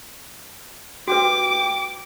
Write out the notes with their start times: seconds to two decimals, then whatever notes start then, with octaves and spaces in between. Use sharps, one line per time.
1.08 F#4 G4 B4 G5 D6